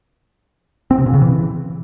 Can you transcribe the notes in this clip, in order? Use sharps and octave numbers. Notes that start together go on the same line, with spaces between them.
C4
C3
A#2
C#3
E3